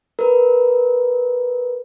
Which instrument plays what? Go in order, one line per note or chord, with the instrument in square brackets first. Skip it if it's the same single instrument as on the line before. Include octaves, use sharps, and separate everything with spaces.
[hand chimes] A#4 B4